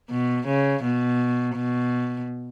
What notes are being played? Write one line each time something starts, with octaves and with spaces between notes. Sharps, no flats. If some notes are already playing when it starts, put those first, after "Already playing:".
B2
C#3
B2
B2